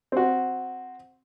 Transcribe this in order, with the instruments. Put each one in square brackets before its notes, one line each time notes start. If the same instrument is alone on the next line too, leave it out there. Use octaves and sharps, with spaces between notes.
[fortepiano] C4 F#4